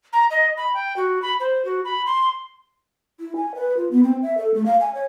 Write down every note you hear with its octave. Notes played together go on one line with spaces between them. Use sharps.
A#5
D#5
B5
G5
F#4
B5
C5
F#4
B5
C6
E4
G#5
B4
F4
B3
C4
E5
A4
A3
F5
G#5
C#5